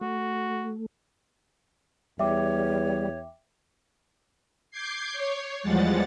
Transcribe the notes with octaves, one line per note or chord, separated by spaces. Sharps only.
A3 F#4
E2 G3 C#5 E5 G5 D6
D6 G6 G#6 C7
C#5
E2 F3 G3 G#3 F#5 A6